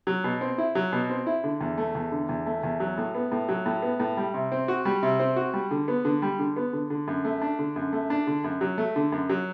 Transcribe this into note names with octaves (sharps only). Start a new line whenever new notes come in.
F#3
B2
C4
E4
F#3
B2
C4
E4
D3
E2
A3
E2
D3
E2
A3
E2
F#3
A2
B3
A2
F#3
A2
B3
A2
G3
C3
C4
F#4
G3
C3
C4
F#4
G3
D3
B3
D3
G3
D3
B3
D3
D3
F#2
A3
D4
D3
F#2
A3
D4
D3
F#2
F#3
A3
D3
F#2
F#3